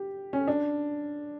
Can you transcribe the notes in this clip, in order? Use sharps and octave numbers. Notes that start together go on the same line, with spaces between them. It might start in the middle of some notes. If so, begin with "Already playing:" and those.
Already playing: G4
C#4
D4